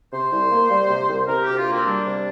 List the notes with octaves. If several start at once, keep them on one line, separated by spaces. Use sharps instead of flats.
C3 C5
C2
A#3
G3
C3
C2
C3 A#4
G4
D2
F4
A#3 C4
G3 D4
C3